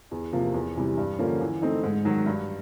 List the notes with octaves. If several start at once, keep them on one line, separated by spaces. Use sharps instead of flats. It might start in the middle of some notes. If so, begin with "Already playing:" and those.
E2
C3 F3 A#3
E2
C3 E3 G3
G2
D3 F3 A#3 C#4
E3
A3 C4 D#4
G#2
D#3 F#3
G2